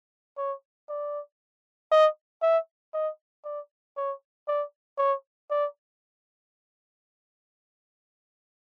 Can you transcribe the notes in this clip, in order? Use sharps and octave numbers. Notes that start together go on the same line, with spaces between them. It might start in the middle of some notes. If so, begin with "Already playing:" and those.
C#5
D5
D#5
E5
D#5
D5
C#5
D5
C#5
D5